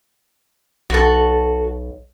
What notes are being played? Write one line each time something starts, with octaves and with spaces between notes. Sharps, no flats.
B1 F#4 A4